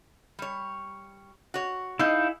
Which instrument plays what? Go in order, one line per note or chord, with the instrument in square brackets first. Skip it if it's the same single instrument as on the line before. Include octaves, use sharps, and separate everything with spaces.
[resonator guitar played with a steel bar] G3 C#5
F#4 C#5
[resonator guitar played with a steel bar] D#4 G#4 [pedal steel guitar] E4 F5 G6